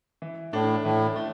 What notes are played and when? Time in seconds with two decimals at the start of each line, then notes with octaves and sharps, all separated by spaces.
0.22 E3
0.53 A2 A3 D4
0.85 A2 E3
1.16 A3